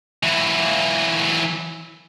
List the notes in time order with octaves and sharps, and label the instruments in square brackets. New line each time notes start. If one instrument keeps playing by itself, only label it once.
[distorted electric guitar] E3 F#3